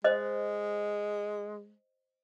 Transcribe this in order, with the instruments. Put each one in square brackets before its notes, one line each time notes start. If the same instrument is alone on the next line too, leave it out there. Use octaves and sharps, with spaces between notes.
[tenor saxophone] G#3 [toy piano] C5 D#5